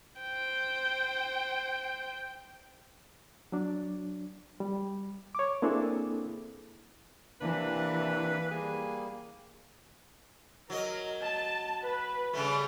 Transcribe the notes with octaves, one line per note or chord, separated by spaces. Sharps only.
C5 G5
F#3 D4
G3
C#5 D6
A#3 C4 D4 E4 G#4 A4
C3 E3 A#3 D4 B4
G3 A#3 G#4
F#3 A#4 D#5
A5
B4
C#3 G3 A3